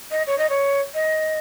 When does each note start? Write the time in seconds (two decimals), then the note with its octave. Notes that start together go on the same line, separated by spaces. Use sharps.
0.11 D#5
0.27 C#5
0.38 D#5
0.49 C#5
0.94 D#5